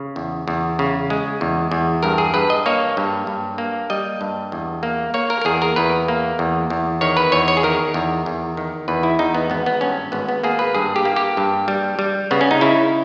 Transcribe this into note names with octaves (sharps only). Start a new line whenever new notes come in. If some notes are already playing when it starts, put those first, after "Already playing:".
Already playing: C#3
E2
E2
C#3
G#3
E2
E2
G2 A#4
G#4
G2 B4
D#5
A#3 C#5
G2
G2
A#3
G3 D#5
G2
E2
A#3
A#3 C#5
A#4
A#4
E2 G#4
A#4
E2 B4
A#3
E2
E2
D#3 C#5
B4
E2 C#5
C#5
G#4
D#3 A#4
E2
E2
D#3
E2 B4
E4
E2 D#4
B3
G#1 B3
B3
G2 C#4
G#1 B3
B3
A#3 G#4
B4
G2 G#4
G4
A#3
G4
G2
G3
G3
C#3 B3
C#4
D#4
C#3 E4